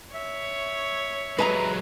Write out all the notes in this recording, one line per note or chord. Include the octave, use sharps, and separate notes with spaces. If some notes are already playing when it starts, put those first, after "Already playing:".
C#5 E5
F#3 G#3 B4 A5 A#5